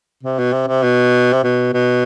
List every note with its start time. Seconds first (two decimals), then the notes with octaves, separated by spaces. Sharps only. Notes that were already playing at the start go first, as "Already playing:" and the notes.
0.23 C3
0.39 B2
0.53 C3
0.68 C3
0.83 B2
1.33 C3
1.43 B2
1.73 B2